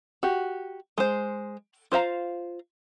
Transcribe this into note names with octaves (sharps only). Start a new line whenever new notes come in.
F#4 G4
G#3 C5
F4 C5 F5 A#5